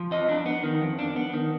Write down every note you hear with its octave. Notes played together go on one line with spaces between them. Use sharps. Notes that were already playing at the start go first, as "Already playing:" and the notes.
Already playing: F3
F2 D#5
D4
B3
D#3
F2
D4
B3
D#3